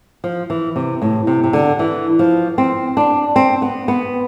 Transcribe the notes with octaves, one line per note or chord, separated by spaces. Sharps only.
F3
E3
C3
A2
C3
C3
D3
E3
F3
C4
D4
C4
B3
B3